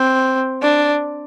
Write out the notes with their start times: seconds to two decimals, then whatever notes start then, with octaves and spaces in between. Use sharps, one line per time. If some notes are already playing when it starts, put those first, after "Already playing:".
Already playing: C4
0.62 D4